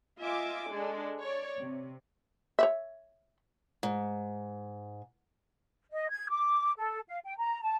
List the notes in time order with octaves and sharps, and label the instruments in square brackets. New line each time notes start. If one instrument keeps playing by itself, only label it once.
[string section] F4 D#5 E5 G#5 D6
G#3 D4 A4
C#5 D5
C3
[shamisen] C#5 D5 E5
[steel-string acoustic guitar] G#2
[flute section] D#5
G#6
D6
A4
F5
G5
A#5
A5